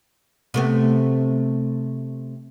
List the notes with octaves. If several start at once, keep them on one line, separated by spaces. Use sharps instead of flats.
C3 A3 B3